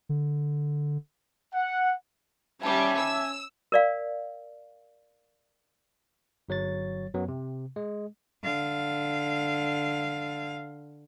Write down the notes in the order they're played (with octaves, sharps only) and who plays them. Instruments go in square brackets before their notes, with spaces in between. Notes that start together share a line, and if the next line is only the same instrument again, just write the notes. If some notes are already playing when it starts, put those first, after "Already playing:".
[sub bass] D3
[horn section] F#5
[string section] G3 [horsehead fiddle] C#4 G#5 [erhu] E5 [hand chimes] A5 D6
[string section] E6
[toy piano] A#4 D5 F5
[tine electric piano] G1 F#3 C#5 A6
F#2 F#3 B3
C3
G#3
[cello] D3 F5